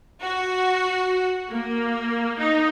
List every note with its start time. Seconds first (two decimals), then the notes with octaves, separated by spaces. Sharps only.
0.22 F#4
1.50 A#3
2.38 D#4